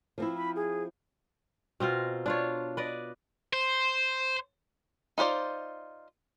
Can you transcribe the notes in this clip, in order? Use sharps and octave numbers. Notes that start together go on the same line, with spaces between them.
F3 C4 E4
B5
G#4
B2 C4 F4 A#4
D4 F4 C#5
B4 D5 D#5
C5
D#4 F4 C5 D5